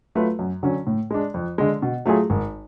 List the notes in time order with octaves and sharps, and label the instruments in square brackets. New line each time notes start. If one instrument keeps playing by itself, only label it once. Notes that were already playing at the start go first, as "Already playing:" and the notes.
[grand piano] F#3 A3 F4 B4
F#2
D3 F#3 C#4
A2
G#3 D4
F2
D3 G#3
B2
F#3 A3 F4 G#4
G#1